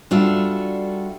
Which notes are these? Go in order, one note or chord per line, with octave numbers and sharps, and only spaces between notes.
G3 D4 F4 F#4 A4 E5